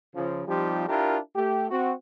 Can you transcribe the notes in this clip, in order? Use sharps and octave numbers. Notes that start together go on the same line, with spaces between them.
C#3 F3
F3 G3 C4 D#4 F4 G4
D4 E4 F4 G4 A#4
A3 G4
C4 F#4